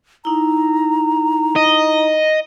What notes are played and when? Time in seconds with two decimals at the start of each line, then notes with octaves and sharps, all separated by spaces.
0.25 D#4 E4 A#5
1.56 D#5